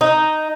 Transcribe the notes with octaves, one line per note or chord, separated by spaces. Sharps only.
D#4